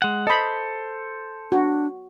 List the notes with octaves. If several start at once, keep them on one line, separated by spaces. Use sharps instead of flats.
G#3 F#5
A4 C5 D#5 B5
D4 F#4